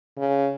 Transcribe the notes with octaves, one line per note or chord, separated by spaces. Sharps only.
C#3